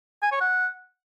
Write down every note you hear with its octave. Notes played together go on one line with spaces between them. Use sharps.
G#5
C#5
F#5